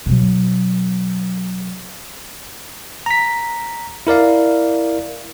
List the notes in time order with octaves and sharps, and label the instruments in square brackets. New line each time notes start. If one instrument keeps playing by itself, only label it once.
[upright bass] B2 F#3
[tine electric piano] A#5 B6
E4 A#4 D5 F5